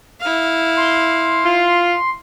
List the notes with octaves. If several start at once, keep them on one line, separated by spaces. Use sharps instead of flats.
E4 F5
C6
F4